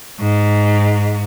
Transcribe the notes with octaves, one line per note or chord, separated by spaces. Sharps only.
G#2